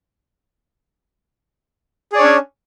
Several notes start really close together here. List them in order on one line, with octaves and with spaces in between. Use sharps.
G#4 D5 C#5 D4 C#4